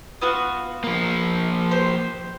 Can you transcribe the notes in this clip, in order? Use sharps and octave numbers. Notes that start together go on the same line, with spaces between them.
B3 F4 F#4
F3 A#3
G4 C5